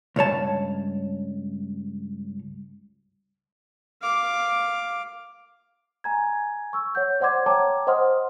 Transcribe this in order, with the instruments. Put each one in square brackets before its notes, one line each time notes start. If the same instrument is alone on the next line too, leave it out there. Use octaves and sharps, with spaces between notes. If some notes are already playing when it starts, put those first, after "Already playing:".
[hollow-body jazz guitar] C#2 G2 C#5 A5
[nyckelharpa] F5 D6
[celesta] G#5 A#5 G#6
C#6 E6
C#5 F#5 G6
C5 D5 F#5 C6 D6 G#6
C#5 G5 A5 A#5 D6
C5 D#5 F#5 C6 D#6 F6